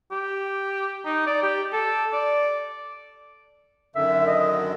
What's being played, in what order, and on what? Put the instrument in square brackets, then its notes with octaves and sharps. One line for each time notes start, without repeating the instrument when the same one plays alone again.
[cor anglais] G4
D#4
D5
G4
A4
D5
[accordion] F#2 D3 D#3 [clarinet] E5
[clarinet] D#5